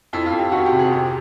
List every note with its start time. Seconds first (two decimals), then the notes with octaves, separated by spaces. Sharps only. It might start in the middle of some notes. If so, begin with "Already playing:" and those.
0.13 F2 E4
0.26 F4
0.32 F2
0.39 G4
0.52 D#3 F#4
0.66 G4
0.72 C3
0.79 G#4
0.92 F2 G4